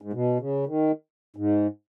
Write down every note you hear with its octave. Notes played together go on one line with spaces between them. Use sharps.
G#2
B2
C#3
D#3
G#2